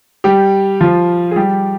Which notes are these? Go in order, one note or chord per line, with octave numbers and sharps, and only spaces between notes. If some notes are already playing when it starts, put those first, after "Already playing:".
G3 G4
F3 F4
G#4
G3 G4